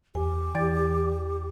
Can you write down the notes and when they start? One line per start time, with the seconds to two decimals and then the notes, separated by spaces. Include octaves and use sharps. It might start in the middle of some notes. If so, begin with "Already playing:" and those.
0.15 E2 G4 G#5
0.55 E2 E3 D5 A6